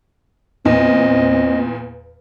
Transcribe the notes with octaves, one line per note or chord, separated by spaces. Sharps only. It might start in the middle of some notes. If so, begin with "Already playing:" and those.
E2 A#2 C4 D#5